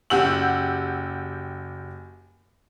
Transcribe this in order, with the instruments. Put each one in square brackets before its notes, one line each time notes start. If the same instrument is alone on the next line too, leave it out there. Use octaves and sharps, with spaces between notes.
[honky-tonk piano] F#1 G4 F#5 E6 F#7